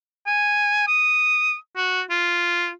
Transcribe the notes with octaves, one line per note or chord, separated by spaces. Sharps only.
G#5
D#6
F#4
F4